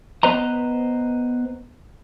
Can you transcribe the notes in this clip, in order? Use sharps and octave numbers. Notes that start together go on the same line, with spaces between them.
B3 B4 C5 D#5 A#5